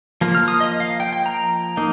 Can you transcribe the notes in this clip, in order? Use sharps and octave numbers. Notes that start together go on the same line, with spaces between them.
F3 A#3
F6
D#6
D#5
F5
G5
G5
A#5
A#3 D#4